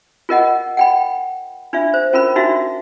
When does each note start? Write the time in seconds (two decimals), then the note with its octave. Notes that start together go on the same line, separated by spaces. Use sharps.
0.29 F4 A#4 D#5 F#5
0.77 F#5 G5 B5
1.73 D4 F4 E5
1.94 C5
2.13 C#4 F4 A#4 B5
2.36 D4 D#4 F4 F#4 E5